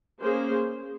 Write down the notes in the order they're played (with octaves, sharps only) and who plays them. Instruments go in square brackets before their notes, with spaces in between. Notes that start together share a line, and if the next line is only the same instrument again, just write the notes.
[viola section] A#3 C#4 G#4 C5